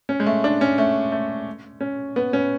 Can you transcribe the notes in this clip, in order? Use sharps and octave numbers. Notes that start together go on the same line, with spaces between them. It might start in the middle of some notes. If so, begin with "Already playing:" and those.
C#4
G#3
A3
D4
C#4
A3
A3
C#4
B3
C#4